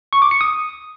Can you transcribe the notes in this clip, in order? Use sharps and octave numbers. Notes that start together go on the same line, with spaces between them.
C#6
D6
C#7
D#6